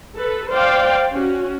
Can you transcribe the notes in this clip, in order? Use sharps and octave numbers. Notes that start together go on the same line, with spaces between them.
A4 B4
C5 D5 F5 G5
C#4 F#4